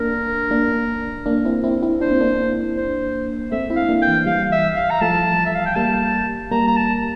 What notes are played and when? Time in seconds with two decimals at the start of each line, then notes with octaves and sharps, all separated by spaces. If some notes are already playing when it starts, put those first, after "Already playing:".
Already playing: A#3 D4 A#4
0.51 A#3 D4
1.26 A#3 D4
1.45 C4 E4
1.64 C4 E4
1.83 C4 E4
2.01 D4 C5
2.11 C4
2.20 A#3 D4
2.77 C5
3.51 A3 C4 E5
3.70 C4 E4
3.76 F5
3.89 A#3 D4
4.02 G5
4.07 E3
4.26 E3 G3 F5
4.52 E5
4.76 F5
4.90 A#5
5.01 F3 A3 A5
5.45 E5
5.55 F5
5.66 G5
5.76 G3 A#3 A5
6.51 G3 A#3 A#5
6.67 A#5
6.76 A5